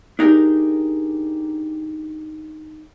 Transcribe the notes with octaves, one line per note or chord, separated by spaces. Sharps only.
D4 D#4 G4 G#4 A#4